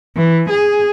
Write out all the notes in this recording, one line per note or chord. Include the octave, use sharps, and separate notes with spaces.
E3
G#4